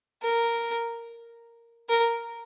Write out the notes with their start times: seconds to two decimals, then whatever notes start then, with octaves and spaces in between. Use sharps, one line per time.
0.23 A#4
1.89 A#4